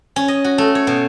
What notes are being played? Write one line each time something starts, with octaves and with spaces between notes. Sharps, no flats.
C#4
D#5
F#4
A3
C#5
B2